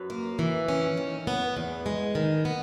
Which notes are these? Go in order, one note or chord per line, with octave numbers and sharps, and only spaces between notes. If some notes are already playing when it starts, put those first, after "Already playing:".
Already playing: F#2 B4
A#3
E3
C#4
D#3
B3
E2
G#3
D#3
B3